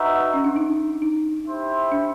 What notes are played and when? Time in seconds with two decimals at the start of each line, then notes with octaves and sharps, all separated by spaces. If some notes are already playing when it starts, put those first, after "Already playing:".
Already playing: D#4 F#4 B4 E5
0.34 C#4
0.44 D4
0.56 D#4
1.02 D#4
1.47 E4 G4 C5 E5
1.92 D4